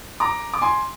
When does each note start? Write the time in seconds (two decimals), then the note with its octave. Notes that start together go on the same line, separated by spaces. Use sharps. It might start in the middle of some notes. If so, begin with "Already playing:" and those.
0.20 A#5 D6
0.54 D6
0.62 G#5 C6